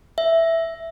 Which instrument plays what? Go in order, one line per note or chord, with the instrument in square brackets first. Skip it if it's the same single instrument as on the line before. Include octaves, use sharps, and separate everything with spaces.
[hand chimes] E5